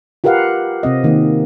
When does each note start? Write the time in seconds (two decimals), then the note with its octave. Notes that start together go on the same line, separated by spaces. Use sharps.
0.24 F4 G4 A#4 B4 F5 F#5
0.83 C3 C4 D#5
1.04 D#3 A#3